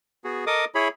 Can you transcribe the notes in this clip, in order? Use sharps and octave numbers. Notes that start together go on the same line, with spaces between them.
B3 F#4 G#4
A4 A#4 D#5 D6 D#6
E4 G#4 C#5 B5